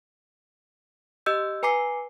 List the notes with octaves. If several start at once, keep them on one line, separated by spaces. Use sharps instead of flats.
G4 D#5 E6 G6
B4 G#5 A#5 D6 C7